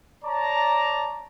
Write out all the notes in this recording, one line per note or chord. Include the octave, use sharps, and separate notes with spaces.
C#5 D5 A5 A#5